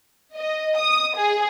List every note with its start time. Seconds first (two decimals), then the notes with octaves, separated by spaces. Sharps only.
0.35 D#5
0.78 D#6
1.16 G#4